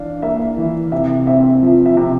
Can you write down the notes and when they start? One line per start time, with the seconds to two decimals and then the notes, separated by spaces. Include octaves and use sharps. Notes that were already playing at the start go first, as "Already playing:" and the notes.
Already playing: E3 D4 F5
0.22 A#3 E5
0.58 E3
0.92 C3 E5
1.27 C4 E5
1.63 F3
1.86 E5
1.97 C3